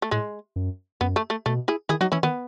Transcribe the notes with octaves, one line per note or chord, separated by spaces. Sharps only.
A3
A2 G#3
F#2
F#2 B3
A3
A3
B2 A3
E4 G#4
D#3 E4 G#4
F#3 D#4 F#4
E3 C#4 E4
D#3 B3